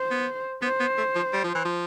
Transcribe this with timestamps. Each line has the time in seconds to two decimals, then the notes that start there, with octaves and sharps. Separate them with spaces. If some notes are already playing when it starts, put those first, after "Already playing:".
Already playing: C5
0.10 B3
0.62 B3 C5
0.80 B3
0.98 A3
1.15 F3
1.33 G3
1.44 F3
1.55 E3
1.65 F3